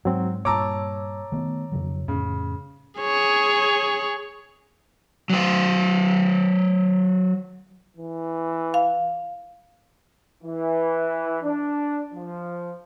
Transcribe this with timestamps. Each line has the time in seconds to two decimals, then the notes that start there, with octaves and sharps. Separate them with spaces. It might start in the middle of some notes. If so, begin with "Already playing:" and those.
0.05 G#2 F#3 C4
0.45 G2 A#2 C#5 A5 A#5 D6 E6
1.32 D#3 A3 B3
1.72 F2 C#3 F#3
2.08 F2 A2 C#3
3.01 G#4 C#5
5.30 F#3 C5
7.97 E3
8.74 F5
10.43 E3
11.43 D4
12.14 F3